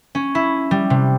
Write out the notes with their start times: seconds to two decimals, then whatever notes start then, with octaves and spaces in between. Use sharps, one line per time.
0.15 C#4
0.35 E4
0.71 G3
0.90 C3